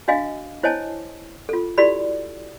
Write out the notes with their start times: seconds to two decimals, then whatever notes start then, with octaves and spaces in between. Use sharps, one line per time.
0.08 D4 F#4 D#5 F5 G#5
0.63 E4 C5 C#5 D#5 G#5 A5
1.49 F4 A4
1.78 E4 F#4 G4 A4 D5 B5